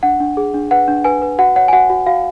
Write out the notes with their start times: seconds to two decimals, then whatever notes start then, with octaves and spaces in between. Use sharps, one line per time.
0.03 D4 F#5
0.20 D4
0.37 G#4
0.54 D4
0.71 B4 F#5
0.88 D4
1.04 B4 G#5
1.22 B4
1.39 F#4 F#5
1.56 C#5 F#5
1.68 G#5
1.73 F#4 F#5
1.90 F#4
2.06 F#4 F5